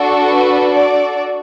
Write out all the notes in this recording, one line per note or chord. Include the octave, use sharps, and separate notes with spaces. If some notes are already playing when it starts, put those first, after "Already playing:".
Already playing: D4 F#4 A4
B4
D5